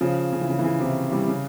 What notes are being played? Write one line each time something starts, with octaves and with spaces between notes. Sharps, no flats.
C#3 F3
C#3
E3
C#3
E3
C#3
C3 E3
E3 G3
C#3